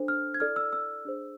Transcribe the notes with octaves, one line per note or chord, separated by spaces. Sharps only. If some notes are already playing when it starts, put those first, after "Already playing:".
Already playing: D4 A4 C5
F6
G#6
E4 A4 D5 F6
E6
E6
D4 G#4 C5